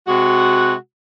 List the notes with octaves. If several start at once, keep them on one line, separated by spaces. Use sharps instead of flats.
C3 G#3 F#4